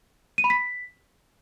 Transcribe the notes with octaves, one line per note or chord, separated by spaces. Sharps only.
D#7
B5
B6